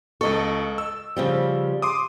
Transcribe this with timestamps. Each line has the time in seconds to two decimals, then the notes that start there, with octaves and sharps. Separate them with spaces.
0.21 C#2 A4 D#5 C#6
0.78 E6
1.16 C#3 F3 G3
1.82 C6 D6 D#6